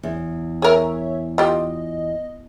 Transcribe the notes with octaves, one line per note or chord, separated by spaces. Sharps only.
E2
G#4 A#4 C#5 E5
F4 G4 D#5